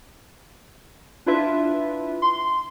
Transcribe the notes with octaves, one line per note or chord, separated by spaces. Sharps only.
D4 E4 F4 B4 E5
C6